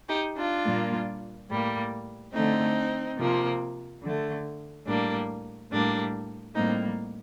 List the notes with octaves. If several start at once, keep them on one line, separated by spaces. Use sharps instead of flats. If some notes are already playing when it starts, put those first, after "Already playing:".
D#4 G4
D4 F4
A#2 G3 A#3
A2 G3 A#3
D3 A3 C4 D#4
C3 F3 A#3
D3 A3
A2 G3 A#3 D4
A2 G3 A#3 D4
A2 G3 A#3 C4 D#4